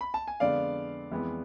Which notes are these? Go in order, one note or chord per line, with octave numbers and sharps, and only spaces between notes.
B5
A5
G#5
F2 D3 G#3 B3 D5 F5
F2 E3 G#3 B3